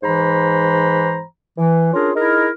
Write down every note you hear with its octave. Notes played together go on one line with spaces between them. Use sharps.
G#2 E3 C5 A#5 B5
E3
C#4 D4 F4 G#4 A#4
D#4 E4 G#4 A#4